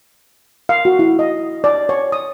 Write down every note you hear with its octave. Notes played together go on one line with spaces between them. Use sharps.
F5
F#4
E4
D#5
D5
C#5
D#6